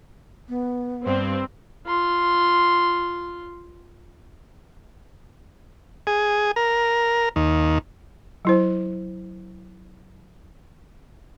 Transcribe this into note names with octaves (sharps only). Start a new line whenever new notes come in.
B3
G2 C4
F4 C6
G#4
A#4
D#2
F#3 E4 C5